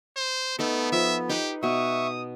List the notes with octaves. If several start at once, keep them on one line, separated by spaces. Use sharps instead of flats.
C5
A3 B3 D#4 A4
F3 E5
D#4 G4 B4 B5
B2 B3 E5 C#6 D#6